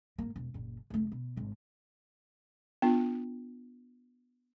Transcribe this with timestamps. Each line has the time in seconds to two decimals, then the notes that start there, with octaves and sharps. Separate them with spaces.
0.18 G#1 A#3
0.36 E1
0.54 F#1 A#2
0.90 F1 A3
1.12 B2
1.37 G#1 G#3
2.82 B3 D4 F4